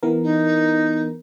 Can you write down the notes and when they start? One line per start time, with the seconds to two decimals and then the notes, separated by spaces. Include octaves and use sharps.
0.03 E3 B3 A#4
0.23 D#4